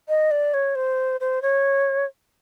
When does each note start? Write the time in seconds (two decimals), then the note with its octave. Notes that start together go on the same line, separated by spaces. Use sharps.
0.09 D#5
0.31 D5
0.54 C#5
0.75 C5
1.21 C5
1.42 C#5